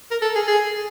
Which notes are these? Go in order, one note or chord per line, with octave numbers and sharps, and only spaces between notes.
A#4
A4
G#4
G#4